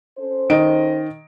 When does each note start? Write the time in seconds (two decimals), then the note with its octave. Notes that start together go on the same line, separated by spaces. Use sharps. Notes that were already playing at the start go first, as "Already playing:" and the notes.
0.18 C#4 A4 C5
0.50 D#3 D#5 D7